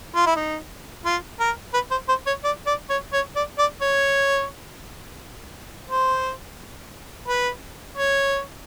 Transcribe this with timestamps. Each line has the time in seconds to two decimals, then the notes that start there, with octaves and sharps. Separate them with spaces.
0.15 F4
0.26 E4
0.36 D#4
1.05 F4
1.40 A#4
1.74 B4
1.91 C5
2.09 C5
2.26 C#5
2.44 D5
2.66 D5
2.90 C#5
3.13 C#5
3.36 D5
3.58 D5
3.81 C#5
5.89 C5
7.28 B4
7.97 C#5